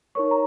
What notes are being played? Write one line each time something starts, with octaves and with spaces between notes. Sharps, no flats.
D#4 A#4 C#5 C#6
A#5